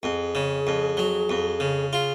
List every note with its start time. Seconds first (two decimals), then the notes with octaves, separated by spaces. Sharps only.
0.03 F2 G#4
0.35 C#3
0.67 F2
0.97 F#3
1.30 F2
1.60 C#3
1.92 F4 G#4